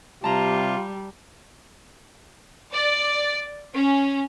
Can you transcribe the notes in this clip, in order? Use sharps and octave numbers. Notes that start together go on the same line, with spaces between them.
C3 G3 F4 A5 A#5
D5
C#4